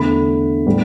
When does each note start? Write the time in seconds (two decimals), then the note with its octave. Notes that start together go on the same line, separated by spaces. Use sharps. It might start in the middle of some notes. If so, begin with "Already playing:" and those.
Already playing: E2 D3 A3 B5
0.66 A2 G3 B3